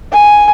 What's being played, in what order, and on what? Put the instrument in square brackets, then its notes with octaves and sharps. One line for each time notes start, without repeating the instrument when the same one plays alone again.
[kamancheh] G#5